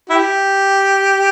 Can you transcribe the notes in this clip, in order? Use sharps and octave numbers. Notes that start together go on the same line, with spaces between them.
E4 G4